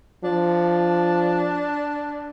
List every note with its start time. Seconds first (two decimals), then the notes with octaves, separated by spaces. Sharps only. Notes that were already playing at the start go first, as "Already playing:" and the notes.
0.24 F3 D4